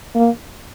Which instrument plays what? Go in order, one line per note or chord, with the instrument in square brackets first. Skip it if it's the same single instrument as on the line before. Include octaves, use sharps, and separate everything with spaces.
[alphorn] A#3